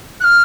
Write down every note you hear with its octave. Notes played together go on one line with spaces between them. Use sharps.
F#6
F6